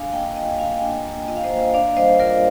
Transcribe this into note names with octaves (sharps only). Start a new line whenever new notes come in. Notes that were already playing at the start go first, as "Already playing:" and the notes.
Already playing: D4 F5 G#5
A#3 D#5 G5
G#5
F4 D#5 G5
A#3 F5 G#5
G#5
D4 D#5 G5
A#3
F4 D#5
F5
C5 D#5
A#3
D4 D5 F5
G3 C5 D#5
F4 A#4 D5